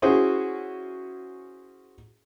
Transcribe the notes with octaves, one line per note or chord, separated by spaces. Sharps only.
C#4 E4 F#4 G#4 C5